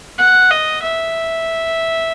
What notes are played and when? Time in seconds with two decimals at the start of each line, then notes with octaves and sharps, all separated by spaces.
0.18 F#5
0.51 D#5
0.82 E5